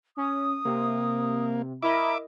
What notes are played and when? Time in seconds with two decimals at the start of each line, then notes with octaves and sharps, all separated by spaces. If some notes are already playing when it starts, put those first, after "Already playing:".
0.17 C#4 D#6
0.65 C3 A#3
1.82 E4 A#4 D#5 E5 B5 D6